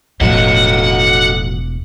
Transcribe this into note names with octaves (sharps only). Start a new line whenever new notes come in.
E1 A2 F3 F#4 A4 D#5 F#5